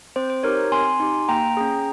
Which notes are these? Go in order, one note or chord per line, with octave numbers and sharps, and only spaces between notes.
C4 C5
C5
D#4 G4 A#4 C#5
C4 G#5 C6
D#4 G4
A#3 G5 A#5
C#4 G#4